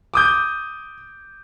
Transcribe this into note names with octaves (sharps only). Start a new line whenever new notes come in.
D6 D#6 G6